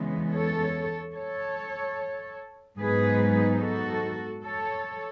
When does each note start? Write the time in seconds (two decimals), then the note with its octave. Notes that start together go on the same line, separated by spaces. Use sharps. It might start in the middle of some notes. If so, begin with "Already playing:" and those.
Already playing: E2 C#3 E3 G#3 B3
0.31 A4 C#5
1.14 A4 C#5
2.78 G#2 F#3 B3 D#4 G#4 B4
3.61 F#4 A4
4.44 A4 C#5